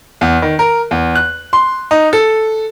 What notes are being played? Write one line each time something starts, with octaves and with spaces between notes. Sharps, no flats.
E2
D#3
A#4
E2
F#6
C6
D#4
A4